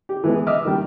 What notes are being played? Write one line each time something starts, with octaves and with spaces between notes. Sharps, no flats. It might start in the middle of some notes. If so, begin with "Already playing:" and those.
G4
E3 G#3 B3
D#5 E5 D6 D#6 F6
D#3 G3